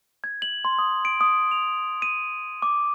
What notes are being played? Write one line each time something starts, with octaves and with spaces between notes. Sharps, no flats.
G#6
F#7
C6
D#6
D7
D#6
F7
D#7
D6